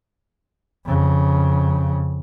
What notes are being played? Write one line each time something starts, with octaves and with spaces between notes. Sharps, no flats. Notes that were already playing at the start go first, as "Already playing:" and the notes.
F2 C#3